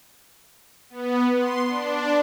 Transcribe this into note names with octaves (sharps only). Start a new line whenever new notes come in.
B3
C6
D4